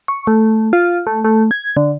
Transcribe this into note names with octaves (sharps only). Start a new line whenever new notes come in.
C#6
A3
F4
A3
A3
G#6
D3